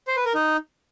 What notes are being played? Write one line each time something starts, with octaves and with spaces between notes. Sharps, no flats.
C5
B4
A#4
D#4